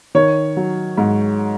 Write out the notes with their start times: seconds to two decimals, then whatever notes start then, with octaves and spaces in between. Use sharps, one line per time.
0.15 D#3 C#5
0.57 F#3
0.98 G#2